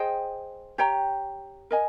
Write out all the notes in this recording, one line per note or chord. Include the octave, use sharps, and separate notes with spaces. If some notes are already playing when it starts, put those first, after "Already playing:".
Already playing: G#4 C5 D#5 G5
G4 C#5 G5 A#5
A#4 D#5 G#5